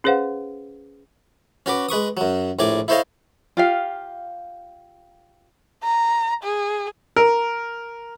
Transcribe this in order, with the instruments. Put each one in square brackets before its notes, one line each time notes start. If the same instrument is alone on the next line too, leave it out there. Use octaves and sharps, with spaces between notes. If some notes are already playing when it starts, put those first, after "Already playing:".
[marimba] C#4 G#4 B4 C5 F5 F#5
[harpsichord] C#4 F#4 B4 D6
G#3 B4 C#6 D#6
F#2 F#3
A#1 A2 D5 G#5 D6
E4 A4 C5 C#5 D#5 F5
[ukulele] F4 G4 F5
[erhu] A#5
G#4
[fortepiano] A#4